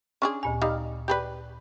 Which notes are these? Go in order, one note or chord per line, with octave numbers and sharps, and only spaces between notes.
C#4 D4 G#4 C6
D2 A#2 G#5
G3 D#4 F5
G4 G#4 B4 D5 B5 G6